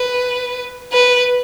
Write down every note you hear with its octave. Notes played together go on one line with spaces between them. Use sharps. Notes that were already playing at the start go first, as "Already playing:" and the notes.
Already playing: B4
B4